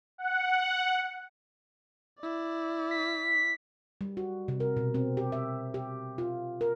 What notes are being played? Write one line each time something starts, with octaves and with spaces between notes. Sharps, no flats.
F#5
E4 D5
B6
G3
F#4
C3
A#4
B2
C4
G4
E5
G4
F4
A#4